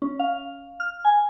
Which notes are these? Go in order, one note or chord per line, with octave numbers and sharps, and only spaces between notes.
C#4
F5
F6
G#5